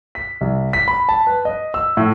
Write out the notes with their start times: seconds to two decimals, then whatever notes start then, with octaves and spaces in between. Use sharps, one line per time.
0.15 B6
0.41 C2
0.73 B6
0.88 B5
1.09 A5
1.27 B4
1.45 D#5
1.74 E6
1.97 A2